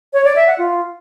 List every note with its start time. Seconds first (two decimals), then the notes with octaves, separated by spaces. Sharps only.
0.13 C#5
0.25 D5
0.36 E5
0.47 F#5
0.58 F4